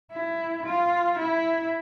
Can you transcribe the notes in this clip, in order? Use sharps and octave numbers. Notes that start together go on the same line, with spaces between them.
E4
F4
E4